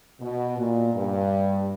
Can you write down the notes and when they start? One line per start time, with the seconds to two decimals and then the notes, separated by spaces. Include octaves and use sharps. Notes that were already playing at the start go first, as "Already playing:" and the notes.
0.21 B2
0.58 A#2
0.95 G2